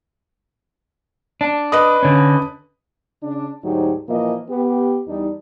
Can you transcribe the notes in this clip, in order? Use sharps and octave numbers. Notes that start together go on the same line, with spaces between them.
D4
B4 D#5 D#6
D3 C#4
C#3 D4
D2 G#2 F#3 D#4 G4
A#2 E3 F3 A#3 D#5
B3 G4
E2 G3 D4 D#4